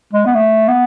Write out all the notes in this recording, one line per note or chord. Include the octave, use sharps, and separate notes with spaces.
G#3
B3
A3
B3